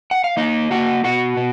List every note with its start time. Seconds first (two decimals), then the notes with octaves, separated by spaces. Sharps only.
0.11 F#5
0.24 F5
0.37 A#3 D#4 D#5
0.71 A#3 F#4 F#5
1.04 B2 F#4 F#5
1.37 B2